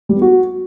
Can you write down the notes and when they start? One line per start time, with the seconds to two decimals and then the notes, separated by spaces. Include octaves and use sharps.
0.09 G3
0.15 B3
0.22 F#4